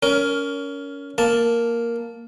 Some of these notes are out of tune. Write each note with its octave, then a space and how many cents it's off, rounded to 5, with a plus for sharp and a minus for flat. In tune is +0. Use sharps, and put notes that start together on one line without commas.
C#4 +25 A#4 +0
A#3 +0 A5 +0